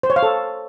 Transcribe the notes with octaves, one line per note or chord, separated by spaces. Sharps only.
C5
C#5
F5
A4